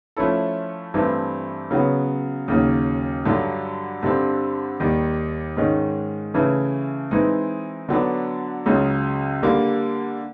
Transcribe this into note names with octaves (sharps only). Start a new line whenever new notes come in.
F3 A3 C#4 E4 A4
G2 E3 A3 C4
C#3 F#3 B3
D#2 C#3 F#3
G2 D3 F#3
G2 D3 G3 C4
D#2 D#3 G3
G#2 D#3 G#3 C#4
C#3 E3 A3
E3 G#3 C4 D#4
D3 F#3 B3 D4
C#2 C#3 F#3
D3 G3 A#3